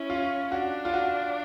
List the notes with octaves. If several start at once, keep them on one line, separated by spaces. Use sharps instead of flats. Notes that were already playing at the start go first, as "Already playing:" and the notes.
Already playing: C#4 E4
F4
D4 F#4
F4
F#4